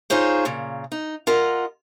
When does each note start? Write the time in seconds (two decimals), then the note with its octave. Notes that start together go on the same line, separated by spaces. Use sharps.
0.10 D#4 F4 G#4 C5 C#5
0.45 A#2 C#3
0.92 D#4
1.27 F4 A#4 D#5 F#5